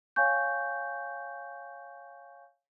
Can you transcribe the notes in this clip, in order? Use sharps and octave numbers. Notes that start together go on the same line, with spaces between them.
C#5 F5 G5 G#5 C#6 G6